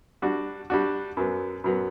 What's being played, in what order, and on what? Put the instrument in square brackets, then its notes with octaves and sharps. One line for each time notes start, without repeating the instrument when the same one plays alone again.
[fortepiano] G3 D4 F#4
G3 D4 F#4
F#2 F#3 B3
F#2 F#3 B3